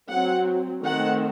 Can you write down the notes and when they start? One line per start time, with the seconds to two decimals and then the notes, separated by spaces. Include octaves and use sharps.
0.11 F#3 C4 F#5
0.84 D#3 A3 C4 F#5